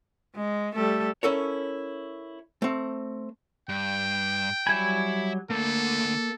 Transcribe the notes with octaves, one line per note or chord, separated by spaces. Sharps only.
G#3
G3 A3 A4
C#4 E4 A4 A#4 C#5
A3 C4
G2 G5
F#3 G3 E5 G#5 B5
D3 A3 A#3 A4